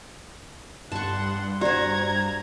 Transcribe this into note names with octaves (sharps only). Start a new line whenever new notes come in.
G2 F#5 A5 C6 C#6
F#4 G4 C5 D5 F#5 A#5 G#6